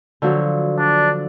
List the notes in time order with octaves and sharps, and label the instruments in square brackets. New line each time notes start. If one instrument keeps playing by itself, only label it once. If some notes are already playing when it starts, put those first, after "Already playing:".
[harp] D3 F3 F#3
[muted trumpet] D4